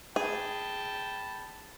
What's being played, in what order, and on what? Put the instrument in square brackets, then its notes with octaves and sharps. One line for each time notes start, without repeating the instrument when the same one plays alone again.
[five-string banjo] G#4 [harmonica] G5 A5 B5